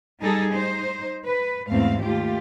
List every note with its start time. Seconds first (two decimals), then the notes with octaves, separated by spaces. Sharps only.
0.21 G3 D#4 G#4 A4
0.53 D#4 C5
1.24 B4
1.70 E2 G#2 A3 C4 F5
2.01 D#2 A3 F4 G4